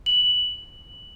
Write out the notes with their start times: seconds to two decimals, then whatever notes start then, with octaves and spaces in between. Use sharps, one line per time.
0.06 F#7